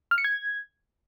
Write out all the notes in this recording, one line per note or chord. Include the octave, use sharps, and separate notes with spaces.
F6
C#7
G#6